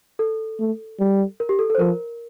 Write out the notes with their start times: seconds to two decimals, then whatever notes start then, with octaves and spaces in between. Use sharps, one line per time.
0.19 A4
0.59 A3
0.99 G3
1.40 A#4
1.49 G4
1.59 A4
1.70 A4
1.75 C5
1.79 F3 A#4